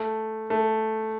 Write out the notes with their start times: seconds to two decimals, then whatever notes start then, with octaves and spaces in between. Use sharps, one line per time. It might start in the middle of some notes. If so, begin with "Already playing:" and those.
Already playing: A3
0.50 A3